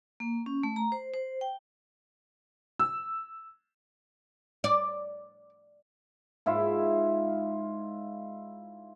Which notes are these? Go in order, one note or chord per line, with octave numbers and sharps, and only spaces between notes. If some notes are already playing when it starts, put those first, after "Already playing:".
A#3
C#4
A3
A#5
C5
C5
G5
E6
D5
G#2 E4 F4 E5